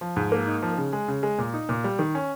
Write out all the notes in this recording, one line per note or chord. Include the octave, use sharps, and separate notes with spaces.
F3
G#2
A#3
D#4
F3
C#3
G#3
C#3
G#3
A#2
D#4
A#2
G3
D#3
C#4